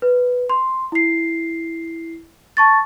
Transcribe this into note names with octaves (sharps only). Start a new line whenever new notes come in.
B4
C6
E4 C7
A5 C#6 A6